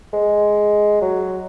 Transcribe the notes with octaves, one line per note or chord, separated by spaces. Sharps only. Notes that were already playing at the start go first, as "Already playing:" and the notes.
G#3
F#3